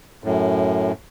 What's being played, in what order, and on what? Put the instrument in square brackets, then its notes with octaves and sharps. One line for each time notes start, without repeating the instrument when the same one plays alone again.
[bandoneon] F#2 A2